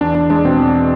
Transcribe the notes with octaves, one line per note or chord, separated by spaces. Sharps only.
E2 D4
E2 D4
G#3 D4
B2 C4
E2